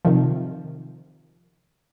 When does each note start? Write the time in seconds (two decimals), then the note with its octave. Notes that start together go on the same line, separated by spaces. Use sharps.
0.05 C3 D#3 F3